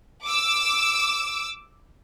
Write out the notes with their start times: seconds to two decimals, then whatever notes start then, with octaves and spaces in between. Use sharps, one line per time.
0.23 D6 E6